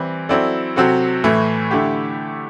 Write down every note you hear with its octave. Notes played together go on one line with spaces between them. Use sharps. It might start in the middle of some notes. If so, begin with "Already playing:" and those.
Already playing: E3 G3 C4
F#3 C4 E4 A4 D5
C3 F#3 C4 F#4 A4
A2 E3 A3
D3 A3 E4 G4